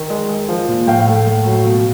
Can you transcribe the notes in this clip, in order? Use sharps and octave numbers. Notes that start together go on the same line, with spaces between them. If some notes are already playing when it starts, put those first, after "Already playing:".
Already playing: D#3
G#3
G#3
F3
A#2
A2 F5 G5
A3
A2
F#3
B2